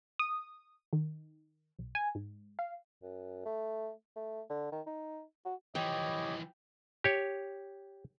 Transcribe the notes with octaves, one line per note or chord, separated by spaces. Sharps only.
D#6
D#3
B1
G#5
G#2
F5
F#2
A3
A3
D3
D#3
D#4
F#4
E3 F3 G4 C#5 D#5 G5
G4 C#5